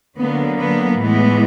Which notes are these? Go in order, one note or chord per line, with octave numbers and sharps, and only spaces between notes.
D3 F#3 A#3 B3
B3
A2 E3 G#3 B3